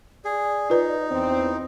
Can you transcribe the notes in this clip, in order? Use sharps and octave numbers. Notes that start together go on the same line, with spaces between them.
G#4 D5
D#4 F4 B4
E2 E3 C4